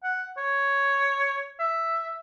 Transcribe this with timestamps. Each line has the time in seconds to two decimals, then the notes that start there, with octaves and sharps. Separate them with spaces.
0.04 F#5
0.37 C#5
1.59 E5